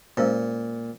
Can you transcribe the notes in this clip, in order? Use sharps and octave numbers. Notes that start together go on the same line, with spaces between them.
A#2 G#3 C#4 C5